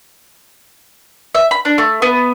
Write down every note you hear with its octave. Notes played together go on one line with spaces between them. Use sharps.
E5
B5
D4
A3
B3